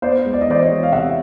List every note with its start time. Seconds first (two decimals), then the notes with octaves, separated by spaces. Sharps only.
0.02 B3 C5 D5
0.25 G#3
0.33 D5
0.41 D#5
0.48 E3 C5 D5
0.63 C#5 D#5
0.70 G#3
0.83 F5
0.92 C3 E5 F#5